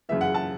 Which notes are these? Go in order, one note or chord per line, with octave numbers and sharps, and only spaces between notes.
F#2 C#3 E3 E5
F#5
A5